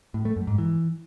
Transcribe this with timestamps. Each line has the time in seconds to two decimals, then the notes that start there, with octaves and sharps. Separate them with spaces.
0.14 A2
0.25 A3
0.36 F#2
0.47 G#2
0.58 E3